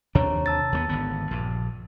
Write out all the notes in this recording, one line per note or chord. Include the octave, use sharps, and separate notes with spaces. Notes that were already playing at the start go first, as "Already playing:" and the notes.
D#2 C3 D4 C#5 A#5
A5 E6 A6
D#2 G#3 B3
G#1 D3 B3
A#1 G2